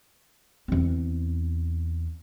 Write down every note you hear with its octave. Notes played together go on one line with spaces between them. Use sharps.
E2 C4